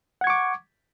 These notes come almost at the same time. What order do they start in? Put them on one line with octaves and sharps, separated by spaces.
F#5 G#6 C#6 D6